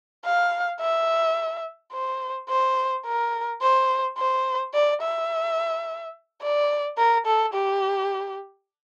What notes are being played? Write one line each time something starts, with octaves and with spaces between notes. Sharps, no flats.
F5
E5
C5
C5
A#4
C5
C5
D5
E5
D5
A#4
A4
G4